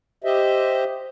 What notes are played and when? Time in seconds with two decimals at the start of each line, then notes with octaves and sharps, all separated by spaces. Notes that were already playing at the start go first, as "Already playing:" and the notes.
0.24 G4 C5 D#5 E5